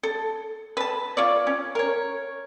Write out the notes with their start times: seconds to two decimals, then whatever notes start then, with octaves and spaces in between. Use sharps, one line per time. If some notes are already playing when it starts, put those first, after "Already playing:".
0.03 A4
0.77 B4 A5
1.17 F4 C#5 D5
1.47 C#4
1.75 A#4 C#5